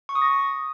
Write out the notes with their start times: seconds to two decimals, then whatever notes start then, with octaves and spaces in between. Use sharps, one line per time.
0.09 C#6
0.15 D#6
0.22 A#6